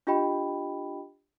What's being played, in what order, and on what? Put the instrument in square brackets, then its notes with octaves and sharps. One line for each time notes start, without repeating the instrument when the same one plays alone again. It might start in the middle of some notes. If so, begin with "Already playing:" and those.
[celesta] D4 F4 G4 D#5 G5 B5